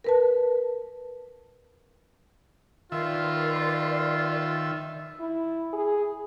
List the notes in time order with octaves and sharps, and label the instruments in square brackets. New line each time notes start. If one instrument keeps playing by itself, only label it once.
[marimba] A#4 B4 A5
[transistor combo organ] D#3 E5 [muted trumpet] F4 [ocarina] A#4 [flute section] B4 D5 C6
[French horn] E4
G#4